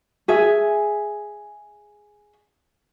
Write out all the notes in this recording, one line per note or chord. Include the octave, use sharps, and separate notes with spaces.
G#4 E5 G#5